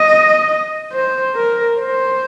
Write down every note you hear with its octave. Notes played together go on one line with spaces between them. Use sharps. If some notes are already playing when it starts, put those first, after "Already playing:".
Already playing: D#5
C5
A#4
C5